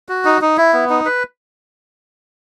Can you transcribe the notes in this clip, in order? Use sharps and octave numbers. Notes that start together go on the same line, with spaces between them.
F#4
D#4
D#4
E4
B3
D#4
B4